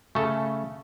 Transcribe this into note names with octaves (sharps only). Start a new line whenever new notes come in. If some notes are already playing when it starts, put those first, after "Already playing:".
C#3 A3 C#4 A4